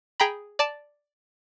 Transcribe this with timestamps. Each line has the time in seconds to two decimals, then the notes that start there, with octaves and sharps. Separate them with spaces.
0.20 G#4 G5 A#5 B5
0.59 D5 A5